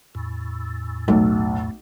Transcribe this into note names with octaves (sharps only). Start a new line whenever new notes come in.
E2 A2
B1 A3 B3